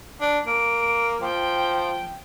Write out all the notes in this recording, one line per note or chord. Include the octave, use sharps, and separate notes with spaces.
D4
A#3 D7
F3 G5